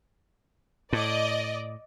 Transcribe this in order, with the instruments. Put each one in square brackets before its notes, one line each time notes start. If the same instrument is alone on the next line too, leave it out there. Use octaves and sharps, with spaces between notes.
[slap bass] A2 [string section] D5 D#5